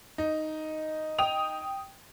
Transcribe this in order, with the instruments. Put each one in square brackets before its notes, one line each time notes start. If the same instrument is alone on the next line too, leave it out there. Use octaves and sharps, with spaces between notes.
[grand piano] D#4
[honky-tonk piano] G5 D#6 F7